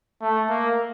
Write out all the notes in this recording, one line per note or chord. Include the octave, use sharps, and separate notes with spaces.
A3
A#3